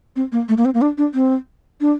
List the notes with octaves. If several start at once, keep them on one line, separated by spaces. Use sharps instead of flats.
C4
A#3
A3
A#3
C4
A#3
D4
D4
C4
D4